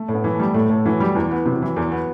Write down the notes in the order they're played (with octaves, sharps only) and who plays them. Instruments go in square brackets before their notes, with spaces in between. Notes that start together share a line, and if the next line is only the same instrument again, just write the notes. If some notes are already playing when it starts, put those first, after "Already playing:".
Already playing: [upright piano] A3
[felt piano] A2
[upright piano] B3
[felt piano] E3
[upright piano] A3
[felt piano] G3
[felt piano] A2 [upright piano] A3
[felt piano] A2
[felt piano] E3 [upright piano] F#3
[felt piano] G3
[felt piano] E2 [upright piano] E3
[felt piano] B3
[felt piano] C3 [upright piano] F#3
[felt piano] E3
E2
B3